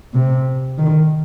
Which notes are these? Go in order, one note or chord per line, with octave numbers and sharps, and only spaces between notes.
C3
D#3